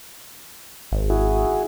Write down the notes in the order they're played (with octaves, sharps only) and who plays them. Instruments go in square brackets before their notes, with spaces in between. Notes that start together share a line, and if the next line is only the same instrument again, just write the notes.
[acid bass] G#1
[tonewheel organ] E4 F#4 G#4